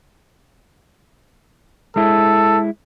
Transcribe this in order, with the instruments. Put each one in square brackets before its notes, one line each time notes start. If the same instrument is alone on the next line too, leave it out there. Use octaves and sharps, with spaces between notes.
[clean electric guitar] G#3 E4 [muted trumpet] A4